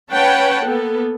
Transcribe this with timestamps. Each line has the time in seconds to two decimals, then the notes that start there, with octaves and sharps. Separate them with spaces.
0.12 C#4 B4 C#5 F#5 G5 A5
0.64 A#3 B3 A4